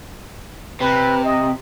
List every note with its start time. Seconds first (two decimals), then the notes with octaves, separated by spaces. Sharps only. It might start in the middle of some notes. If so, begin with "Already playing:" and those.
0.81 C3 B4
1.24 D#5